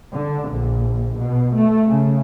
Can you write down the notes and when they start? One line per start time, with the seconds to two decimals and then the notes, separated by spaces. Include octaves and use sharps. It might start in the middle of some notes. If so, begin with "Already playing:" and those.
0.13 D3
0.50 A#1
1.20 B2
1.55 A3
1.89 C#3